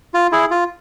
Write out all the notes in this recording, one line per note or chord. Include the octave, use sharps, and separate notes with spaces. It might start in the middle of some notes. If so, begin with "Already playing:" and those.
F4
E4 G#4
F4